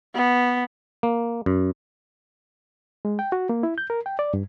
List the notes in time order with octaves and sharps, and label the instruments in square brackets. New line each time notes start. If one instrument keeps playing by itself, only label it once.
[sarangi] B3
[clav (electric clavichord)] A#3
F#2
[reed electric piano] G#3
G5
F#4
A#3
E4
G6
A#4
G5
D5
G2